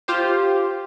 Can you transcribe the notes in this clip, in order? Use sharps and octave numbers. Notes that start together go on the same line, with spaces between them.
F4 G4 C5